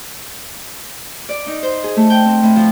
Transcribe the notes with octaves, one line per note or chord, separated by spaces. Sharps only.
D5
D#4
C5
G#4
A3
G5
C4
A2
F3